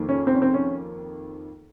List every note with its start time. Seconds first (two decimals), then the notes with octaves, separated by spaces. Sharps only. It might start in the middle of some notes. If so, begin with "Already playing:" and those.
Already playing: F2 D#3 A#3
0.09 C#4
0.27 C4
0.34 C#4
0.42 C4
0.54 C#4